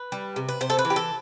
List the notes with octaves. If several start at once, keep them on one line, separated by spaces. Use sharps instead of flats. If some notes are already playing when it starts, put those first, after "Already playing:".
Already playing: B4
G3
C3
B4
C3 C5
A4
B4
E3
G4
A4